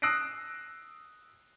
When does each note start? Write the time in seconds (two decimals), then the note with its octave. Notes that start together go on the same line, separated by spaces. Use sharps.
0.02 D#6 E6 F#6 A#6 C7 D7